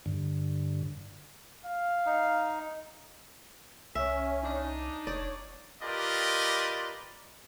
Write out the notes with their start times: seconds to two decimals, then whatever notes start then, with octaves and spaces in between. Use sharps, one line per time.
0.06 G2 D3
1.66 F5
2.06 D#4
3.95 C2 C#4 E5
4.43 D4 D#4
5.07 F1 C#5 D5
5.83 F4 G4 A#4 B4 D5 D#5